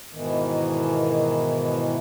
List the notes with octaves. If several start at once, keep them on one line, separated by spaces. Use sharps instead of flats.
G#2 B2 D#3 E3